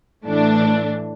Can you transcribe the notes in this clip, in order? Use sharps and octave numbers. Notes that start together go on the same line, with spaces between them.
A2 E3 A3 D4